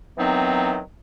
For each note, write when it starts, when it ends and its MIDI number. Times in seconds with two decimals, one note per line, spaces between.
0.18 0.78 51
0.18 0.78 52
0.18 0.78 54
0.18 0.78 59
0.18 0.78 60
0.18 0.78 63